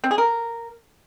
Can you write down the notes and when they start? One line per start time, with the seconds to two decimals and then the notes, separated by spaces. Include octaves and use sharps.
0.04 C4
0.11 G#4
0.18 A#4